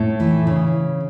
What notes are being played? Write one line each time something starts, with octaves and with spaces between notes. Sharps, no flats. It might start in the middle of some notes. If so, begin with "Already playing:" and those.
Already playing: A2
E3
C#3